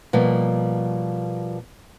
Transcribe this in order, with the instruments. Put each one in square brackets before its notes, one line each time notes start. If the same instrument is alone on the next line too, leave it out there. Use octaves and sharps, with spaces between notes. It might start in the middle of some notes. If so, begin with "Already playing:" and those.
[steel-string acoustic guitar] B2 F3 G3 A#3